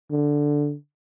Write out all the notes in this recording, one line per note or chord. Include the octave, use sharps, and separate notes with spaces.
D3